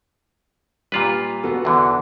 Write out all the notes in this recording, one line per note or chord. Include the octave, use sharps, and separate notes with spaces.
A#2 G3 F4 B4
B3 F#4 A4
E2 D3 E3